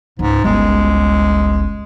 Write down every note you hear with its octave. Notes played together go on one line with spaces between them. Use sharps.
C#2 G#2
G1 C#2 G#3